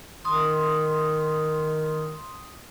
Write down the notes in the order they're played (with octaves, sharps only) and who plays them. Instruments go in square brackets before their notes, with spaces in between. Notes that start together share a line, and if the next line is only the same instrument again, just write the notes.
[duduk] D#3 [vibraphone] C6 D#6